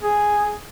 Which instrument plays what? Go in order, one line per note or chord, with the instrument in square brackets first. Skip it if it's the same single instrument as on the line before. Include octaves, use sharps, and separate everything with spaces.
[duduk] G#4